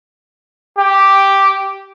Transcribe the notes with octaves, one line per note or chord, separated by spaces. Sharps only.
G4